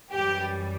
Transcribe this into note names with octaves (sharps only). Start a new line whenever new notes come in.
F#2 E3 G3 G4